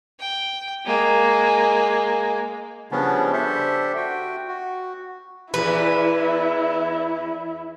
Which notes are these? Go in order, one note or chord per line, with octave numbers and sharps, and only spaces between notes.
G5
G#3 A#3
C#3 F3 G3 B3 C#4 D4
D4 G4 A4 C5 E5
F#4 G5
F#4
E2 E3 E4 B4